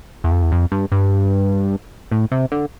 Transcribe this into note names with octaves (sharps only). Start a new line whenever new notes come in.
E2
F2
E2
F2
G2
G2
A2
C3
D3